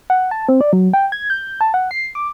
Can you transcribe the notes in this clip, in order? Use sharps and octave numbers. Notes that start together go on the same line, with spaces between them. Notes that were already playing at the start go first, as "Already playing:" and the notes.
F#5
A5
C4
D5
F#3
G5
G#6
G6
A5
F#5
C7
D6